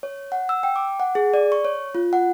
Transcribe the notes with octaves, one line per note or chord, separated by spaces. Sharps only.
C#5
F#5
E6
G5
D6
F#5
G#4
D5
C#6
C#5
F4
F#5